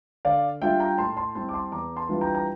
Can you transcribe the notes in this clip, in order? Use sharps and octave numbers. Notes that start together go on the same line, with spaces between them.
D3 D5 F5
G3 D4 F4 E5 G5
G5 A#5
A2 A5 C6
A5 C6
G3 C4 E4 A5 C6
D6
A5 C6
E2 A#5 D6
A5 C6
E3 G3 D4 F4
G5 A#5
A#5